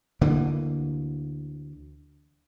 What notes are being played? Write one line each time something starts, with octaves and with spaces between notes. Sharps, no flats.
D2 D3 E3 A#3